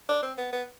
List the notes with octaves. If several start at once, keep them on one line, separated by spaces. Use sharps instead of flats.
D4
C4
B3
B3